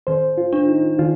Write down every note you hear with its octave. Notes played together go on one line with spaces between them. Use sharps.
D#3 C5
F4
D4
D#4
D#3 F4